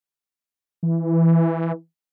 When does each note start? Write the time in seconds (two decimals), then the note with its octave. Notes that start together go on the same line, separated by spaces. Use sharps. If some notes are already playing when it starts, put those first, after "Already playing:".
0.83 E3